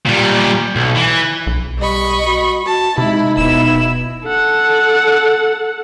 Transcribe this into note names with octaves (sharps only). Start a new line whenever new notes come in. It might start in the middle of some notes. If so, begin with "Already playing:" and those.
A#2 G3
B1
E3
B1
G3 D#5 B5 C#6
F#4
F#4 A5
C3 G#3 D#4 E4
D#1 B2 E4 E6
A4 F#5